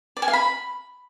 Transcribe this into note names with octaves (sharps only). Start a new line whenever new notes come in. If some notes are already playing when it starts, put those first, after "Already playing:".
D5
G#5
F5
B5